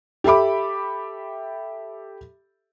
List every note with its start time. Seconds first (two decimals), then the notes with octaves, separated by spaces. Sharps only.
0.24 G4 A4 E5 B5 D6